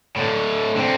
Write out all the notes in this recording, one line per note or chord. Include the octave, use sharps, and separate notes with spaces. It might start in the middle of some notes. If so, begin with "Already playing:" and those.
A2 D3
D3 C4